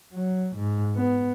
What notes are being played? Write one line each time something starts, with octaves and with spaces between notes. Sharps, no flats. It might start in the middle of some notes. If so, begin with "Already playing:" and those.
F#3
G#2
B3